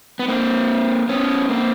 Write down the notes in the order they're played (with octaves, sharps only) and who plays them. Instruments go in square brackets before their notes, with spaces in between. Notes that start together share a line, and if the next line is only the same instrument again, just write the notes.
[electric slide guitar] B3
A#3 C4
B3 C#4
A#3 C4